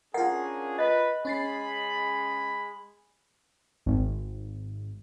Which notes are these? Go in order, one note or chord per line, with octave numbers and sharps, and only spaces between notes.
C#4 D4 F4 G#4 A#4 F#5
B4 D#5
G#3 C#4 G#4 B5 A6 C7
G#1